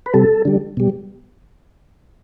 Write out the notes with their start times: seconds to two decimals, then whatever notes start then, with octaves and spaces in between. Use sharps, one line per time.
0.06 B4
0.14 C3 G3 A4
0.45 D3 G3
0.77 B2 G3